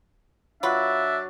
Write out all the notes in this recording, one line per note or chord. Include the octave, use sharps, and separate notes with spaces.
F#3 D4 F4 B4 E5